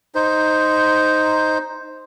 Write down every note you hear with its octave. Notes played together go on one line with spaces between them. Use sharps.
D#4 C5